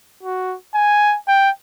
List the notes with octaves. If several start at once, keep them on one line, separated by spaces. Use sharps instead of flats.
F#4
G#5
G5